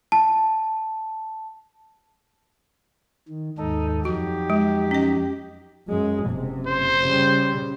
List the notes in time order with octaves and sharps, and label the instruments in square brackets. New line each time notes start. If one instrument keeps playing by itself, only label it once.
[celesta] A5
[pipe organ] D#3
[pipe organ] D#2 G#2 A4 [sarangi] D#4
[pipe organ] F2 F#3 D#4 [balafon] F#4 [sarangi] G4
[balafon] G#3
C#4 D#5
[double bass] F#2 G#3
F#1 C3
[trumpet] C5
[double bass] C#3 G3